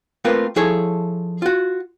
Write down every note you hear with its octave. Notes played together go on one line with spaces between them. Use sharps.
A3 A#3 C4 F4 A#4 B4
F3 E4 G#4 A4 C#5
F4 F#4